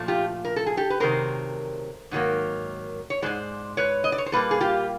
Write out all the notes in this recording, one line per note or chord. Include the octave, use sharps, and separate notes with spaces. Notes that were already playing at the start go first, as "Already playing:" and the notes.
Already playing: A#2 F3 A3
F4 G4
A#4
A4
G#4
G4 A4
B4
C3 D#3 F#3 A3 A#4 C5
G#2 D#3 F#3 A#3
C#5
G#2 E3 G#3 C5 D5
B4 C#5
D#5
D5
C#5
C5
A#2 G3 A#3 A4 B4
G#4
F4 G4